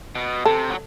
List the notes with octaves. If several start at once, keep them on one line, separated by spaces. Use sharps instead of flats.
B2
C3 A4
F#3